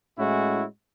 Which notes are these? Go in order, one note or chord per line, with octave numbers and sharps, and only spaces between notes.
A2 G#3 C#4 E4 F#4